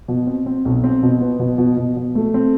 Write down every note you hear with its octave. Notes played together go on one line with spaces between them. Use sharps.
B2
C4
C4
B1
C4
B2
B3
B2
B2
B2
B2
A3
C4